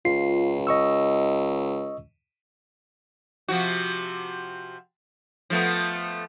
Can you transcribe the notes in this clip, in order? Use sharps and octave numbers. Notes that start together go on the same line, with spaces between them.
C#2 F4 C7
D#5 C#6 E6
C3 F3 F#4
F3 A3 B3